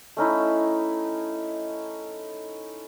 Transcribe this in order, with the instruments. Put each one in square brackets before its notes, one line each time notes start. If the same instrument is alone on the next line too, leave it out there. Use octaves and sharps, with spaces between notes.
[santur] A3 C#4 D#4 E4